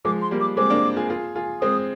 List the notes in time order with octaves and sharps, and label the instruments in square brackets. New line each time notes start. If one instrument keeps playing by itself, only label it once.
[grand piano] F3 G#3 [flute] D6
[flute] C6
[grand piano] G3 A#3
[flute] D6
[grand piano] G#3 C4 [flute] D6
[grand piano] A#3 D4
F4 G#4
F4 G#4
F4 G#4
[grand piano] G#3 C4 [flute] D#6